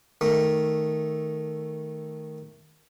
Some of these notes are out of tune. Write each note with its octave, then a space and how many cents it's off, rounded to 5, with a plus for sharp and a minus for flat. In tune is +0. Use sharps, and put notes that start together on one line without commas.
D#3 +0 A3 +0